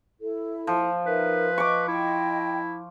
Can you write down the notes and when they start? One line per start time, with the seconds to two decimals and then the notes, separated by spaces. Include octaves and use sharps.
0.19 E4 A4
0.67 F3
1.06 D#4 A#4 B4 E5
1.58 D#5 C#6 D6
1.88 E4 D#5 G5